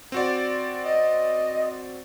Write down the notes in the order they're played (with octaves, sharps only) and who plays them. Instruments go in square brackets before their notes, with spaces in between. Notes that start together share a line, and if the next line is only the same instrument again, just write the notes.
[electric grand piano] C4 F#4 D5
[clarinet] D#5